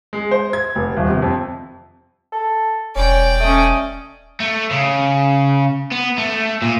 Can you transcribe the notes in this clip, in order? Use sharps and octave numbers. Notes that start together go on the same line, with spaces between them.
G#3
C5
G#6
F1
D#1
C3
F2
A4
E1 C#4 D5 G5
A3 C#4 D#5
A3
C#3
B3
A3
A#2